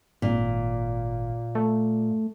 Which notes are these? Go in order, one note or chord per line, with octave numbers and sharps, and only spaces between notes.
G#1 A#2
A3